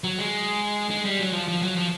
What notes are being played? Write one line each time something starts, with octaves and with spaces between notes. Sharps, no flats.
F#3
G#3
G#3
G3
F#3
F3
F3
F#3
F3